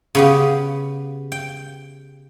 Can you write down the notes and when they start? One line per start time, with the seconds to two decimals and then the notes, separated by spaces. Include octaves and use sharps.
0.15 C#3 B3 G4
1.32 G5